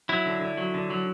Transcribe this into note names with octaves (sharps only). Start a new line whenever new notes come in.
F#3 E4
D3
D3
F#3
D3
F#3